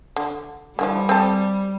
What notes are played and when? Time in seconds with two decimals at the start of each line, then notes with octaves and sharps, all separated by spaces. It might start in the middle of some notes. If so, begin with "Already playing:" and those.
0.16 D3
0.79 D3 E3 F3 G3
1.09 C4 G#4 A4